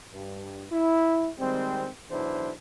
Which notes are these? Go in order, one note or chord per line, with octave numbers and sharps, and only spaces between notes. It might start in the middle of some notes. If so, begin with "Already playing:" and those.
G2
E4
D#3 G3 G#3 C4
B1 E2 D4 E4 C5